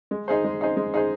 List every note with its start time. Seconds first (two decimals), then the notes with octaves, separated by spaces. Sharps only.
0.11 G#3
0.28 D#4 G#4 C5
0.44 G#3
0.61 D#4 G#4 C5
0.76 G#3
0.94 D#4 G#4 C5